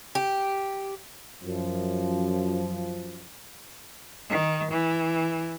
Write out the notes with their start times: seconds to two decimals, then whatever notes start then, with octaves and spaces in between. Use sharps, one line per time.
0.15 G4
1.43 F#2 F3
4.30 D#3
4.71 E3